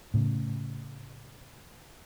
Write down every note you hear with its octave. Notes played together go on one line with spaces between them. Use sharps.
A2 C#3